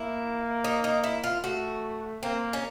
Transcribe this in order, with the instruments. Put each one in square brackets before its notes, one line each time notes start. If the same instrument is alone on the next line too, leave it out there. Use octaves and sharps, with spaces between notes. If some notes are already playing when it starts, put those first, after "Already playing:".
Already playing: [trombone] A#3 [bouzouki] E4
[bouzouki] D#4
D#4
E4
F4
[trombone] A3 [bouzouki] F#4
[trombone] A#3 [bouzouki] C4
[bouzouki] C#4